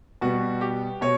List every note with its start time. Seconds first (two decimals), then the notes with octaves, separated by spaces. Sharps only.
0.21 B2 G3 B3 F#4
0.61 G4
1.01 B2 C#5